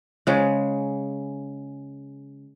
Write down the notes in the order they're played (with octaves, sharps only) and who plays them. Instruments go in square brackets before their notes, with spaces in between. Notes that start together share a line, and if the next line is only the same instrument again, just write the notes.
[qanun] C#3 G#3